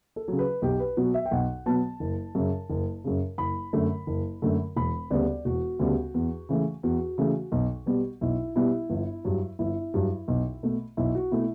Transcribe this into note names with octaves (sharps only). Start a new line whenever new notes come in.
A4
C#3 F#3
B4
B1 G4
B4
B2 F#3 B3 F#4
E5
G5
B1 F#5
B2 F#3 B3 A5
F#1
F#2 C#3
F#1
F#2 C#3
F#1 B5
F#2 D3 A3
F#1
F#2 D3 A3
E1 B5
D2 C#3 G3 B3 D5
E1 F#4
D2 C#3 G3 B3
E2
C#3 E3 A3
E2 F#4
C#3 E3 A3
B1
B2 G3 B3
B1 E4
B2 G3 B3 E4
G1
G2 F#3
G1 E4
G2 F#3
B1
B2 A3
B1 E4
F#4
B2 A3 E4